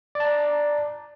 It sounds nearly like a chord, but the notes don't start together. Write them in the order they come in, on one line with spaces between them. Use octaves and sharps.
D5 A5 A#5